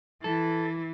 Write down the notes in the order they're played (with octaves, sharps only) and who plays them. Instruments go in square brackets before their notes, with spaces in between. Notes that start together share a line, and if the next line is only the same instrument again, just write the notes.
[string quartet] E3 [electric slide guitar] A4